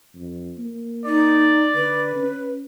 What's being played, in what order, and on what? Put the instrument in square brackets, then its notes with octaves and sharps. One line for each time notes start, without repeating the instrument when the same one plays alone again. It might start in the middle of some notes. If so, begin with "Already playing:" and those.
[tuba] F2
A#3
[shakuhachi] D#4 [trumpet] D5
[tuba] D3 [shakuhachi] B4
[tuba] C#4